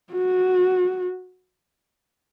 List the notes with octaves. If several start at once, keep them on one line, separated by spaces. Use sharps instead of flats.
F#4